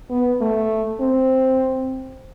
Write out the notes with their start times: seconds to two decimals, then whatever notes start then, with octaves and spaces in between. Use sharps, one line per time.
0.11 B3
0.41 A3
1.01 C4